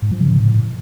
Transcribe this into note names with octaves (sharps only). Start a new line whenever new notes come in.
G#2
F3
C#3
G#2
A2